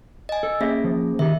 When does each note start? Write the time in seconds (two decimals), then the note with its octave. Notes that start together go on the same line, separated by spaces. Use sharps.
0.29 D#5 G#5
0.43 A4
0.61 A#3 C#4 G#4 C#5 E5
0.84 F3
1.19 D#3 G4 E5